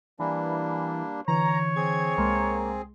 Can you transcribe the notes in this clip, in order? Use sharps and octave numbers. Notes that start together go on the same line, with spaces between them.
E3 G3 A#3 D4
D3 E3 C#5 A#5
C4 G#4 G#6
C2 G#3 A#3 C6